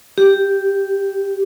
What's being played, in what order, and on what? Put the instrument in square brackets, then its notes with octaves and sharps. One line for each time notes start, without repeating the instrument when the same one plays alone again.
[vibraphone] G4